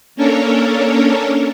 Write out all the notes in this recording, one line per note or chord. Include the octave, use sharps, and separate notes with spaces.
A#3 C#4 D4 A4 A#4 C#5